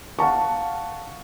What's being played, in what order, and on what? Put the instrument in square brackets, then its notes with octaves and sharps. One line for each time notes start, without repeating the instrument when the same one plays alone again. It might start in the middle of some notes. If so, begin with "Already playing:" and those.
[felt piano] F5 F#5 A5 C#6